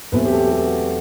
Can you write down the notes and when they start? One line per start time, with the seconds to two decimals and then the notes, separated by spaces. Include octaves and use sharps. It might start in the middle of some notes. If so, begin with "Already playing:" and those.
0.12 E2 B2 F#3 A3 C4 B4
0.26 G4
0.32 A4
0.38 G4
0.52 G4
0.65 F#4